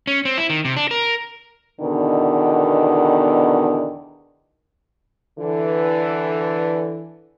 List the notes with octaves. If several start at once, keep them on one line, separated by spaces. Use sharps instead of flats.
C#4
C4
E4
D#3
C3
D4
A#4
E2 B2 D3 D#3
D3 E3